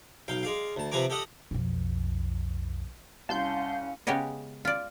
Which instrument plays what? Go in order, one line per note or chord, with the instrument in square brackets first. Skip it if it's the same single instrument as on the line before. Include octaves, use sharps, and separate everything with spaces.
[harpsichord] B1 F5 G5
G#3 D5 F5
D2 A5
C3 F3 B4 G#5 A#5 D6
G4 A4 D#5 F#5 D#6
[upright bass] B1 F2
[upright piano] C2 [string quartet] C#4 [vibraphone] F5 [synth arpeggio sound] A5 C6 G6
[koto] C#3 G#3 B3 G4 C#5 D#5
F4 D5